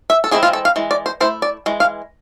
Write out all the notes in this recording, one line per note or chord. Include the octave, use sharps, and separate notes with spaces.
E5
A4
E3 G#3 C4 E4 G#4
F4
A4
F5
E3 G#3
D5
C5
A3 E4 C5
D5
E3 G#3
F5